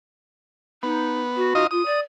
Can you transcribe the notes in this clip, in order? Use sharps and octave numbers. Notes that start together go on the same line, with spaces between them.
B3 D#4
F#4
D#4 F4 D#5
F4 D#6
D5